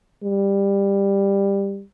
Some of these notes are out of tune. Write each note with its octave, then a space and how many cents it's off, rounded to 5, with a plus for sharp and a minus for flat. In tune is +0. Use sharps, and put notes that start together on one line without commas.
G3 +15